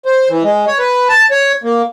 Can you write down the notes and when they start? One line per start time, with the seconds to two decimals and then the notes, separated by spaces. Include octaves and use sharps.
0.06 C5
0.30 E3
0.44 G#3
0.67 C#5
0.79 B4
1.09 A5
1.31 C#5
1.64 A#3